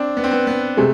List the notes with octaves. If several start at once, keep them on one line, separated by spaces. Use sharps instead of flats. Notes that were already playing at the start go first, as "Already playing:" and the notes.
Already playing: C4 D4
B3
C4
B3
B3
C3 G#3 A3